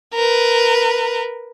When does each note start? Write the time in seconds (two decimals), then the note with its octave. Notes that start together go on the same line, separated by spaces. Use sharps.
0.14 A#4 B4